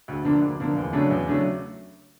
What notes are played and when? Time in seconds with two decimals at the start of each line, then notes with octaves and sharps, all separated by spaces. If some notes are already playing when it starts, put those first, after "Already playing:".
0.08 D2
0.24 D3 F3 A#3 D4
0.41 D2
0.59 D3 F3 A#3 D4
0.76 E2
0.93 C#3 F#3 A3 D4
1.11 E2
1.28 C#3 F#3 A3 D4